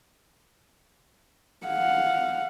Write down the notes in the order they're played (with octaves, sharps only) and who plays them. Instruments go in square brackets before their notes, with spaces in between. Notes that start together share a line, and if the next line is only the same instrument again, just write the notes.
[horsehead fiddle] F5 F#5